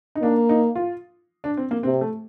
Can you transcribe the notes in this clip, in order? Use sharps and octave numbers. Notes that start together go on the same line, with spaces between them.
D#4
A#3 D4
D#4
F4
D4
C4
A#3
C3 C4
A3